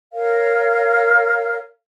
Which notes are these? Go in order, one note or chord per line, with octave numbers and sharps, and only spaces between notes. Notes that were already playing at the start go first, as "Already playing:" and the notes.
A#4 C#5 F5